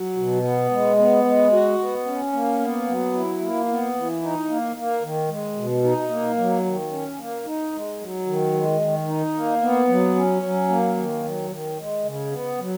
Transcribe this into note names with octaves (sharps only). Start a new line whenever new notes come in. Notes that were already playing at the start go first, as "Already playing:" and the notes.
Already playing: F#3
B2
B3
G#3
B3
G#3
F#4
B3
C#4
A#3
B3
F#3
E4
A#3
B3
E3
D#4
A#3
A#3
D#3
G#3
B2
D#4
A#3
F#3
D#3
C#4
A#3
D#4
G#3
F#3
D#3
G#3
D#3
D#4
A#3
B3
F#3
C#4
F#3
A#3
D#3
F#3
D#3
G#3
C#3
B3
F#3